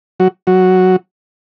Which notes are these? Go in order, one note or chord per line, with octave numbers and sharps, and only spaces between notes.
F#3 F#4
F#3 F#4